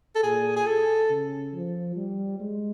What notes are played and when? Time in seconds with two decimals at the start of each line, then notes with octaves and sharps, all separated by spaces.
0.15 A4
0.23 A#2 G#4
0.56 G#4
0.66 A4
1.09 C#3
1.54 F3
1.96 G3
2.40 G#3